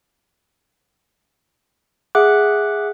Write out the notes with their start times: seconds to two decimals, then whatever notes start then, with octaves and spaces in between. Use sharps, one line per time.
2.15 G#4 E5 F#5 D6 F#6